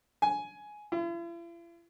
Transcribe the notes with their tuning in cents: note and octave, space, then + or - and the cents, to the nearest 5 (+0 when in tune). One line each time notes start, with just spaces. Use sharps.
G#5 +10
E4 +45